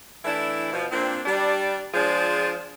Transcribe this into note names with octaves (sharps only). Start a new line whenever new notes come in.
E3 A3 D4 E4
B2 F3
A#2 C4 D4
G3 D4
F3 G#3 D4 F4 G#4 C5